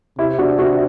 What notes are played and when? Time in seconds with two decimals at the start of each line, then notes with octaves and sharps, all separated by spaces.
0.18 C3 E4 G4
0.38 D4 F#4
0.59 D4 F#4